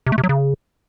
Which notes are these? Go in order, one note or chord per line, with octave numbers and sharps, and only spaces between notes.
C3
A3
C3
F#3
C#3